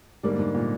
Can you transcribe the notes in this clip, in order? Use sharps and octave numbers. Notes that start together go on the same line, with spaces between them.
G#2 D3 G3 A#3
G#2
A#2